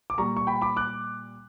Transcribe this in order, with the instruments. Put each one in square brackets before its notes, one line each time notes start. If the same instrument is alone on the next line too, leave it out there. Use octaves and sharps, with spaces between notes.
[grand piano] D6
A#2 G3 A#5 C#6
C#6
G5 B5
B5 D6
D6 F#6